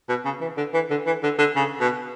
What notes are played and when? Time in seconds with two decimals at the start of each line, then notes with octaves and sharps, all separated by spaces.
0.09 B2
0.25 C#3
0.41 E3
0.57 D3
0.74 E3
0.90 D3
1.06 E3
1.23 D3
1.38 D3
1.56 C#3
1.80 B2